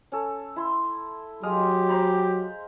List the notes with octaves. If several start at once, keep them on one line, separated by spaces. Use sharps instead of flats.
C#4 A4
E4 C6
F#3 G#3 G4 F5 D#6
C5 A#5 B5